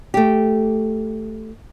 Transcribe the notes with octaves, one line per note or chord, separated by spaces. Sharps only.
A3 G4